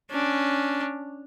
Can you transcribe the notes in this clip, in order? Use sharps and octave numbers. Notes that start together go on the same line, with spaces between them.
C#4 D4